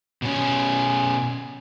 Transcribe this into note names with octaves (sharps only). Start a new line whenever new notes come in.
B2 C#4